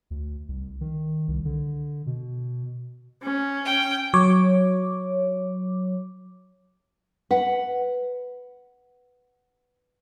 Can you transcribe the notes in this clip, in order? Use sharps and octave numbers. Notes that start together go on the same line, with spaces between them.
D2
C2
D#3
C2
D3
B2
C#4
G5
F#3 C#5 D6
B4 F#5